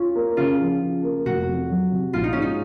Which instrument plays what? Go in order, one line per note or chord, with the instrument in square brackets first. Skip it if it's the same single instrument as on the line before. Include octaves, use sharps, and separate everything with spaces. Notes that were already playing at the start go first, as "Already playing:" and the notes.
Already playing: [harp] C#4 [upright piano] F4
[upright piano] A#3
[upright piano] C#3 [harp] F4
[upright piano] F3
C#3
A#3
[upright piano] F1 [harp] F#4
[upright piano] F2
F#3
C3
[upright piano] A#1 [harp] F4
[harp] D#4
[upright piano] G#2 [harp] C#4
[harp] D#4